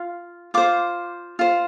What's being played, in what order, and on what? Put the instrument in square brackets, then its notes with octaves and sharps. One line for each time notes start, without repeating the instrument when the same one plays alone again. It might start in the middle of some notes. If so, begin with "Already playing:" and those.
Already playing: [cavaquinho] F4
F4 C5 D6
F4 C5